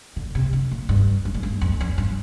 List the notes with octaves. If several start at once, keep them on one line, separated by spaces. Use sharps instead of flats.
D3
C3
D3
A#2
G2
G2
A2
G2
F2
F2
G2